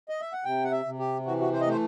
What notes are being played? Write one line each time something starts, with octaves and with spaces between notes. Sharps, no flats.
D#5
E5
F#5
C3 G5
F#5
E5
C3
G4
E3 F#4
F#4
C5
D#5
A3 C5